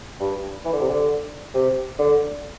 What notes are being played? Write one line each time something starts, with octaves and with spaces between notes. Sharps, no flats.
G2
E3
D3
C3
D3
C3
D3